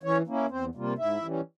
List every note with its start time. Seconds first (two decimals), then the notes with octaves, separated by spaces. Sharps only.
0.03 E3 C#4 C#5
0.27 A#3 C#4 E4
0.50 E2 C4 C5
0.75 C3 G3 A#3 F4
0.98 G#2 E4 E5
1.22 E3 G3 C#4